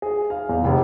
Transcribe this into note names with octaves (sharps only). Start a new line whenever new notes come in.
G#4
F5
E2
F1